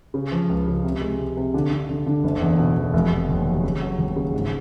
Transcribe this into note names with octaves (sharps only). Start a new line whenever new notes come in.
C#3
F3
C#2
C#3
C3
G#3
C3
C3
D3
D3
D3
D3
F#1
E2
B2
E2
F1
F1
D#2
F#3
C#3
F#3
D#2
C#3
G#2